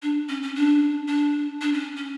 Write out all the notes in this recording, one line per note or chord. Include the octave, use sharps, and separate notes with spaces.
D4
C#4
C#4
D4
D4
D4
C#4
C#4